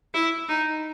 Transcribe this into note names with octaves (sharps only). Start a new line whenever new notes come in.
E4
D#4